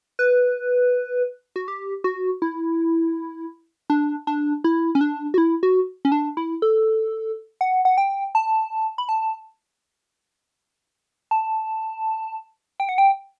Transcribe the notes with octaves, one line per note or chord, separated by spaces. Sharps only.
B4
F#4
G4
F#4
E4
D4
D4
E4
C#4
D4
F#4
E4
F#4
C#4
D4
E4
A4
F#5
F#5
G5
A5
B5
A5
A5
G5
F#5
G5